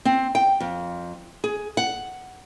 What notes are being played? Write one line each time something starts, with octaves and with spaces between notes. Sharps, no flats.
C4
G5
F2
G#4
F#5